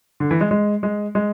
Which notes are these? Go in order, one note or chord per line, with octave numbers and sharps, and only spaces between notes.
D3
E3
G#3
G#3
G#3
G#3